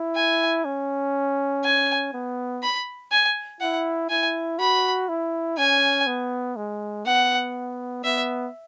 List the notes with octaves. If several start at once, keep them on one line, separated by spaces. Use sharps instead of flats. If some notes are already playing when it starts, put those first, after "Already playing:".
Already playing: E4
G#5
C#4
G#5
B3
B5
G#5
E4 F#5
E4 G#5
F#4 B5
E4
C#4 G#5
B3
G#3
B3 F#5
B3 E5